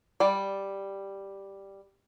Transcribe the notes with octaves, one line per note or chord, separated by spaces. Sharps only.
G3 D5